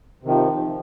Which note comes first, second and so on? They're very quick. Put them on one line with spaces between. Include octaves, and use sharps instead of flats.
C3 D#3 F3